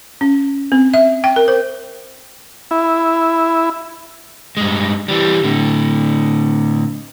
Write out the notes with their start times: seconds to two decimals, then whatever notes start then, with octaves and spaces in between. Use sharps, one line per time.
0.21 C#4
0.72 C4
0.94 E5
1.24 G5
1.36 A#4
1.48 C5
2.71 E4
4.57 G2 G#3
5.08 E3 G3
5.44 A2 D3